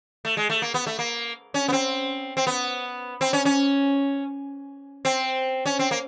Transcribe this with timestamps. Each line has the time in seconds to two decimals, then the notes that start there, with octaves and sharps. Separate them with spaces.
0.25 A3
0.37 G#3
0.50 A3
0.62 A#3
0.74 B3
0.87 A3
0.99 A#3
1.54 C#4
1.68 B3
1.73 C4
2.37 C4
2.47 B3
3.21 C4
3.33 C#4
3.45 C#4
5.05 C4
5.66 C#4
5.79 C4
5.91 A#3